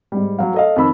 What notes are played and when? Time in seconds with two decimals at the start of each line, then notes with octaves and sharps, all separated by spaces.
0.12 G#2 G3
0.39 F#3 F5
0.54 A4 D#5 F5
0.76 F2 D#3 B5 E6